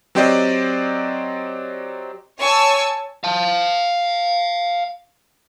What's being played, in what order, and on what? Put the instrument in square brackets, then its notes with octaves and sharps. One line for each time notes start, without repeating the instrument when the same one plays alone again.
[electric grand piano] F#3 C4 G4 C5 D5 D#5
[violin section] C#5 G#5 A5 C#6 E6
[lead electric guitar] F5 A5